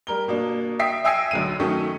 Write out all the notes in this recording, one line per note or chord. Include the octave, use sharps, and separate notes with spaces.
G3 A#4 G7
B2 A#3 D4
E5 G5 D#6 B6 C7
E5 G5 G#5 E6 A#6 C7
B1 D3 D#7
D#3 F#3 A3 C#4